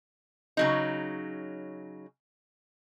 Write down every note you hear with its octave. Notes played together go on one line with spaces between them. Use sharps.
C#3 F#3 D#4